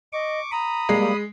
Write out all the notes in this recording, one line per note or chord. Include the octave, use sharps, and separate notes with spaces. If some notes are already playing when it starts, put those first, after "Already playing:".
D#5 C#6 D6
A#5 B5 D#6
G3 G#3 A#3